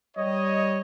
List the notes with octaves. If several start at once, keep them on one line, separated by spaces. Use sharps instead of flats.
G3 C#5 D#5